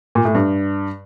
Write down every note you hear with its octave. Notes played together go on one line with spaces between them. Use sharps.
A#2
A2
G2